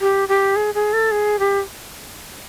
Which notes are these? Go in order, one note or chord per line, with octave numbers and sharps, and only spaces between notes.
G4
G4
G#4
G#4
A4
G#4
G4